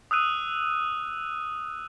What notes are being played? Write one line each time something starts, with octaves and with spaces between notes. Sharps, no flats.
D#6 E6 F#6 D#7